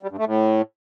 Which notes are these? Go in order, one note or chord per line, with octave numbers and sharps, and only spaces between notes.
G3
G2
A3
A2